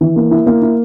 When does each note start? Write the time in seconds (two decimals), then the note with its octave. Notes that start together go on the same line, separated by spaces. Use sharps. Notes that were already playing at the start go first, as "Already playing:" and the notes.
0.01 E3
0.16 A#3
0.31 E4
0.46 A#3
0.62 E4